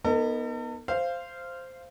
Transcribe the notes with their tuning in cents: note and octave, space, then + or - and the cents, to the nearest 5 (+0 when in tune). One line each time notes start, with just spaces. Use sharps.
B3 -20 D#4 +0 A4 +45
C5 +0 F5 -15